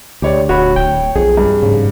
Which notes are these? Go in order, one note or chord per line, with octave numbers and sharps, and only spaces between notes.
D2 G4 C#5 D5
D#1 F#4 C#5 B5
D1 G5
B1 F2 G#4
G2
F1 G#2 C#3